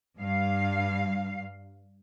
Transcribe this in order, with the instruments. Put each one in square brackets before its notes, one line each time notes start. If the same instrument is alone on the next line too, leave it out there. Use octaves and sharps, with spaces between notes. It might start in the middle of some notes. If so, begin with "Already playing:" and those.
[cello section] G2 F5